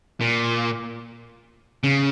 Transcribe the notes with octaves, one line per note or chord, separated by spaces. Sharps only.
A#2
C#3